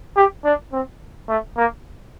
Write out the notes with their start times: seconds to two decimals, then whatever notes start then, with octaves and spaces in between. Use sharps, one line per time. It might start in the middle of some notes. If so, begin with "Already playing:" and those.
0.16 G4
0.45 D4
0.73 C4
1.29 A3
1.57 A#3